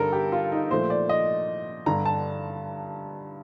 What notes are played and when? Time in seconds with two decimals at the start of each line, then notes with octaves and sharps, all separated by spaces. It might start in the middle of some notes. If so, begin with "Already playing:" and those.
Already playing: G2 D3 G3 A4 A#4
0.13 G4
0.32 F4
0.52 D#4
0.71 A#2 F3 A3 C5
0.90 D5
1.09 D#5
1.86 G2 D3 G3 A#5
2.05 A5